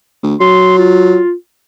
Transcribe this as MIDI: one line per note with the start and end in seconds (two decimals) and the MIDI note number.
0.23 0.35 38
0.40 1.19 54
0.40 0.73 84
0.78 1.32 65